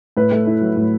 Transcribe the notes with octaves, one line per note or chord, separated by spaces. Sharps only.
A2 B4
A3
E4
F#3
A2